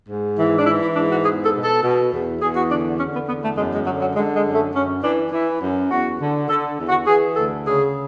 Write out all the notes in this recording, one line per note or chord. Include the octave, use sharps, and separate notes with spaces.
G#2
E3
D4
E3 E4
E4
G#2 D4
F#4
E2 G#4
A4
B2
A4
B2
E2
E2 G#4
F#4
D3 D4
D3 C#4
B3
E2 B3
A3
F#2 G#3
G#3
D3 F#3
F#3
D3 G#3
G#3
F#2
A3
F#2 C#4
E3 D4
E3 E4
F#2
E2 F#4
D3
D3 A4
E2
F#4
E3 G#4
D2 A4
C#3 G#4